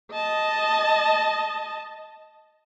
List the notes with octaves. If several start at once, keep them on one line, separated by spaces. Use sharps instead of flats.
D#5 A5